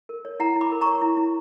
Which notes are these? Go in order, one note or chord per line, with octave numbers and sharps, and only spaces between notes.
A#4
C#5
E4 F#5 A#5
E4
B5 D6
A#4
C#5 A#5 C#6
E4
E4